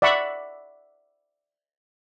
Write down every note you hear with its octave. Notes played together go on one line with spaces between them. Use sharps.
D5 E5 F#5 B5 C#6